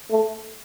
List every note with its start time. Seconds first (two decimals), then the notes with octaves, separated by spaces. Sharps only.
0.10 A3